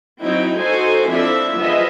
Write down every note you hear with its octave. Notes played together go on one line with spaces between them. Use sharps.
F#3 C4 D#4 E4 G5
D#4 F#4 A4 C5 G#5
F3 C4 D4 E4 A4 E5
F3 B3 G#4 D#5 E5